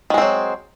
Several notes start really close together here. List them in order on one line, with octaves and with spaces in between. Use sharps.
D#3 G#3 C4 F#3